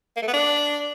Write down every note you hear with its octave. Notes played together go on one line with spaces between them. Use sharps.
A#3
A3
B3
D4